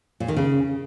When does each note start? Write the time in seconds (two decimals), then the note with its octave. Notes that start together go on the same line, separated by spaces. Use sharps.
0.20 A#2
0.28 D#3
0.37 C#3